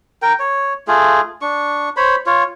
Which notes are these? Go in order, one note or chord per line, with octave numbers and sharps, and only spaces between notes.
A#4 G5
C#5
A3 F4 G#4
D4 C#6
C5 C#5 B5
F4 C#5